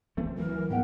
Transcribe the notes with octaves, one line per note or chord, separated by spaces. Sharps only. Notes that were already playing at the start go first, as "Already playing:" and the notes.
E3 A3 C4
D2 E3 F#3 A#4
G#2 A#3 B3 F#5 G5